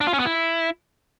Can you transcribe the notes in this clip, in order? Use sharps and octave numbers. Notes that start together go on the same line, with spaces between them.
D4
F4
C#4
B3
E4